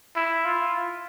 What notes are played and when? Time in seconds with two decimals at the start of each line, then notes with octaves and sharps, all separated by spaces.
0.16 E4
0.45 F4